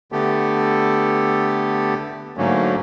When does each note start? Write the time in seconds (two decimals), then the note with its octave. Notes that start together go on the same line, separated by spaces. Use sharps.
0.12 D3 A3 B3 G4 A4
2.37 G#2 D3 F#3 A3 A#3 C#4